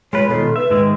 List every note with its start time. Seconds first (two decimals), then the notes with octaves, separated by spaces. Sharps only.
0.13 G#3 F4 B4 C#5
0.29 B2 D#3 F4 A4
0.56 B4 E5
0.70 G#2 D#3 G#3